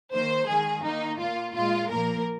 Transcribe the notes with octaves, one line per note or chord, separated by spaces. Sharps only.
D#3 A#3 C5
D#3 G#3 G#4
D#3 A#3 D#4
A#2 A#3 F4
A#2 G#3 F4
A#2 F3 A#3 A#4